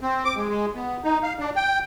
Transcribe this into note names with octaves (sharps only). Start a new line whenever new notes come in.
C4
D6
G#3
G#3
B3
D#4
F5
D4
G5